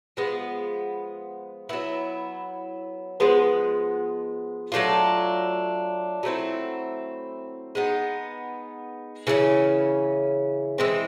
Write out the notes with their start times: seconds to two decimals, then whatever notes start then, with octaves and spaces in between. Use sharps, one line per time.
0.17 F3 G#3 B3
1.69 F#3 B3 E4
3.20 F3 G#3 B3
4.72 F#3 A3 D4 F4
6.23 F#3 A3 C4 E4
7.75 G#3 B3 D#4
9.27 C#3 E3 A3 C#4
10.78 E3 G#3 C4